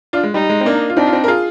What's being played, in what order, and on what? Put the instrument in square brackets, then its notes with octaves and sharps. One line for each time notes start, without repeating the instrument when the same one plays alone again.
[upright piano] D4 F4
G#3
[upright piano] G3 [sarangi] D#4
[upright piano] G#3
C4
A#3 D4
F4
[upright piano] C4 D#4 [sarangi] D4
[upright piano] F4
C4 D#4
A#4
F4 G#4